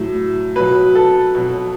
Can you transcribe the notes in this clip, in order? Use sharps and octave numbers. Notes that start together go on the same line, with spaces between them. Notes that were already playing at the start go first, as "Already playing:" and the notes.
Already playing: A2 F#3
B2 F#3 B4
A4
B2 F#3